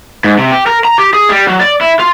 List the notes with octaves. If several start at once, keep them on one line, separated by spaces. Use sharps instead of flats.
G#2
C3
G4
A#4
A#5
G4
G#4
G3
F#3
D5
E4
F4